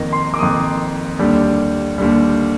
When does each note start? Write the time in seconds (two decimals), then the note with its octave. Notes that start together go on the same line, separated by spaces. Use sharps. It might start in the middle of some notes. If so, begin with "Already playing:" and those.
Already playing: F2 D#3 A#3 A#5
0.13 C6
0.34 D6
0.39 F2 D#3 A#3 D#6
1.19 D#2 D3 G3
1.98 D#2 D3 G3